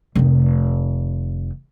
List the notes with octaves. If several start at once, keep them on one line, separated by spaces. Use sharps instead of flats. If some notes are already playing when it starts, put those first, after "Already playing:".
F1 D#3